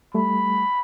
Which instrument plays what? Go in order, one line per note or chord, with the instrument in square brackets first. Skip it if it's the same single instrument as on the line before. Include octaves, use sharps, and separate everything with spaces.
[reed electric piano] G3 A3 [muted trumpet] B5